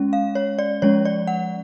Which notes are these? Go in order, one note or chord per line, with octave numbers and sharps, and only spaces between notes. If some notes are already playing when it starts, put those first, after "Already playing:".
Already playing: G#3 C#4
F5
C#5
D5
F3 G#3 C#4 C#5
D5
F#5